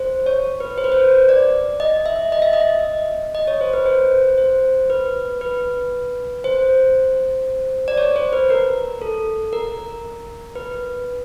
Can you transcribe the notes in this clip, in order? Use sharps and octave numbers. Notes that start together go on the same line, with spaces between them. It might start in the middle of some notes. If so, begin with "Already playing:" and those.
Already playing: C5
C#5
B4
C5
B4
C5
D5
D#5
E5
D#5
E5
D#5
D#5
C#5
C5
B4
C5
C5
B4
B4
C5
D5
C#5
C5
B4
A#4
A4
A#4
B4